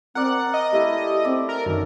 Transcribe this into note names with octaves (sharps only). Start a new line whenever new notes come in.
C4 A#4 D5 F#5
D#5
A3 E4 G4
C4 D5
A#4
F#2 D#3